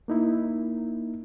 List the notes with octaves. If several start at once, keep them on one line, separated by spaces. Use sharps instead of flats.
A#3 D#4 E4